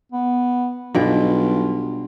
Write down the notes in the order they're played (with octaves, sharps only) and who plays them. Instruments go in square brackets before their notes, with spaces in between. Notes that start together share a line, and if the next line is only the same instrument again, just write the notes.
[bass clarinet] B3
[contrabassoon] B1 [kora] G2 B2 G5 [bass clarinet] F4